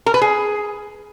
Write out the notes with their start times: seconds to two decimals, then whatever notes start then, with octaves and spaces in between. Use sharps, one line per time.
0.06 A#4
0.14 B4
0.22 G#4